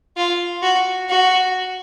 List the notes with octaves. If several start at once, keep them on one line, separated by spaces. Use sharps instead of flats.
F4
F#4
F#4